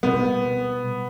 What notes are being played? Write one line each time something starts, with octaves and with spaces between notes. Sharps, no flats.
B2 G3 B3